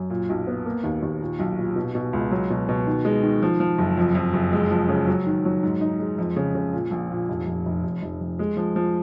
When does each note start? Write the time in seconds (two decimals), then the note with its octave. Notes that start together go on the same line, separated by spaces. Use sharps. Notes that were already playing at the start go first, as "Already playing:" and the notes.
Already playing: F#2
0.10 A#2
0.29 B1
0.47 B3
0.66 A#3
0.83 D#2
1.02 D#2
1.21 A#2
1.39 B1
1.58 A#2
1.76 B2
1.95 B2
2.13 C#2
2.31 F#3
2.50 B2
2.69 B2
2.87 D#3
3.05 G#3
3.23 D#3
3.42 F3
3.60 F3
3.78 F#1
3.97 F2
4.15 F2
4.33 F#1
4.52 G#3
4.71 F3
4.89 C#3
5.07 F#3
5.26 D#3
5.45 F#3
5.63 G#2
5.81 D#4
5.99 G#3
6.18 F2
6.36 C#3
6.55 C#3
6.73 A#2
6.91 A#1
7.11 A#2
7.29 F1
7.46 F1
7.66 F1
7.84 F1
8.02 F1
8.21 F1
8.39 G#3
8.57 F3
8.76 F3